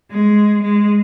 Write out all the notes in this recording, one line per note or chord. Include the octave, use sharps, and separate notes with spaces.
G#3
G#3